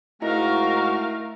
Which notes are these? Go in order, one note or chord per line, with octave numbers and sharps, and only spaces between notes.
G#2 A3 E4 F#4 A#4 D#5 F5 A#5